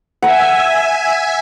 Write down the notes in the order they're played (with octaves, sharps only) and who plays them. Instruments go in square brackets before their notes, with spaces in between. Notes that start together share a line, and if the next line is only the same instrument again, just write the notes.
[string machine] E5 G#5 [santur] F#5 A#5